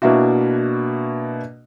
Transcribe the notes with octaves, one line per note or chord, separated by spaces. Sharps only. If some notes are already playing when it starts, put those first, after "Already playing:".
B2 A#3 D4 E4 F#4